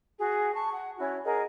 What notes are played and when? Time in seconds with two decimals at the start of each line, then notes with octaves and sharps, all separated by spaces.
0.19 F#4 G#4
0.54 A5 C#6
0.73 F#5
0.99 C#4 E4 F#4 C#5
1.25 G#4 A#4 D#5 F#5